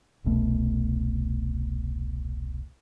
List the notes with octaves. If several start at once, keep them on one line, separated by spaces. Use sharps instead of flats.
E1 C2 B2 A3